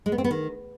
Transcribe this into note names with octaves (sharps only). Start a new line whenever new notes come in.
G#3
B3
C4
B3
D#3